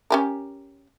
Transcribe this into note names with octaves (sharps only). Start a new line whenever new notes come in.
C#4 G4 A#4